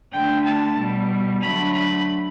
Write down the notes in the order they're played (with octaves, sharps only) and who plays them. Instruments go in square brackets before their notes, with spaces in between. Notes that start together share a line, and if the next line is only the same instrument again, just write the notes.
[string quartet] D3 A3 G5
A5
B2 G3
D3 F#3 A3 B5
B5